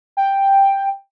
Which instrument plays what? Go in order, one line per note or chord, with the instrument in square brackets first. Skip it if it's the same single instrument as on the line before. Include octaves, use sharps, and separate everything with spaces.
[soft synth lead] G5